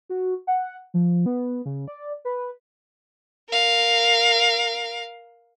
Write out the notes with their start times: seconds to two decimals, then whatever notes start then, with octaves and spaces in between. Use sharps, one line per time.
0.09 F#4
0.47 F#5
0.94 F3
1.26 B3
1.66 C#3
1.88 D5
2.25 B4
3.49 A#4 F5